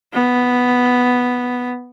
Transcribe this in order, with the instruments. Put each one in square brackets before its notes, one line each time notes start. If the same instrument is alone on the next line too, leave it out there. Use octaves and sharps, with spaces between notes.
[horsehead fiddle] B3